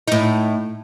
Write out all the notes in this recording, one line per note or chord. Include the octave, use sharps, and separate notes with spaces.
A2 D#4